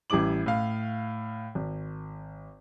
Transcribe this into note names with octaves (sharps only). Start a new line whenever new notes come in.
A1 G3 E4 D6 F#7
A2 F5
G#1